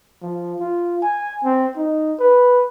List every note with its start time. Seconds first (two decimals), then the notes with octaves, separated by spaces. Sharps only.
0.22 F3
0.60 F4
1.02 G#5
1.45 C4
1.77 D#4
2.19 B4